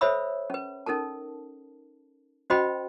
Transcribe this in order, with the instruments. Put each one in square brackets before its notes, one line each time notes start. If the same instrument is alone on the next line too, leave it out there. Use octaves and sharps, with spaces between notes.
[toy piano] A4 C5 C#5 E5 B5 E6
C#4 B4
C#4 D#4 A4 A#4 A5
C#4 F#4 C5 D#5 G5 B5